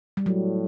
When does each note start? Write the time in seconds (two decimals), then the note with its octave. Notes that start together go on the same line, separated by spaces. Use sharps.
0.17 G3
0.26 A2 F#3